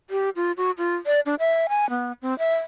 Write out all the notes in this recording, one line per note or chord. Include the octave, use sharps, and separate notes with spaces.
G4
F4
F#4
F4
D5
D4
E5
G#5
B3
C4
E5